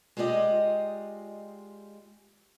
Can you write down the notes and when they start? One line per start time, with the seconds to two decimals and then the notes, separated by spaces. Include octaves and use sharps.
0.17 G#3 F4 G4 D5 D#5